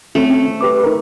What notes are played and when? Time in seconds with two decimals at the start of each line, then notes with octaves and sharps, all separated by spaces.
0.15 A3 C4 C#4
0.61 G4 B4 D6
0.84 D#4 A#4